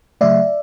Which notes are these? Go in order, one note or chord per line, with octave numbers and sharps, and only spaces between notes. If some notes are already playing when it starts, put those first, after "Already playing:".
C#3 F#3 A3 D5 E5